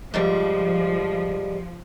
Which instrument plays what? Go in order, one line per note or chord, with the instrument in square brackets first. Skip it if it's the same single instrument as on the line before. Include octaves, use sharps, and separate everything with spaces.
[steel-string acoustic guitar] G#2 C#3 G3 [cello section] F3